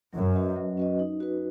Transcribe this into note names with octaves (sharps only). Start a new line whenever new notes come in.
F#2 F#3
C#4 F#4 B4 D#5
F#3
C#4 F#4 B4 D#5
D#4
F#4 B4